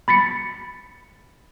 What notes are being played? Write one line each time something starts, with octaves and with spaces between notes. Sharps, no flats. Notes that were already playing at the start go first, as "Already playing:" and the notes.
B5 A6 B6 C#7